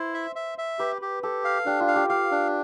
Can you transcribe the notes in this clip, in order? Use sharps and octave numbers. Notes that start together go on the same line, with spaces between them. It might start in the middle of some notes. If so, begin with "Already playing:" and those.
Already playing: E4 C5
E5
E5
E5
G4 B4
G4
G4 A4
F5
D4 G4
F4
F5
G4
G4 F5
D4